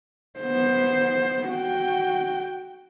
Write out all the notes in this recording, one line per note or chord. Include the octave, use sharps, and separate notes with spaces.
B3 C5
F#4 G5